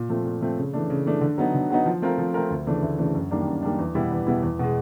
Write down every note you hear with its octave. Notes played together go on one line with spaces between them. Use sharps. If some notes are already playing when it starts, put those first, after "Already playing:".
Already playing: A#2
F3 A3 C4
A#2
F3 A3 C4
C#3
E3 A3 D4
C#3
E3 A3 D4
D3
F#3 B3 D#4
D3
F#3 B3 D#4
F3
A3 C4 F4 A#4
F3
A3 C4 F4 A#4
D2
C#3 E3 A3 D4
D2
C#3 E3 A3 D4
F#2
D#3 G3 A#3 D4
F#2
D#3 G3 A#3 D4
E2
B2 G3 B3 E4
E2
B2 G3 B3 E4
E2
B2 G#3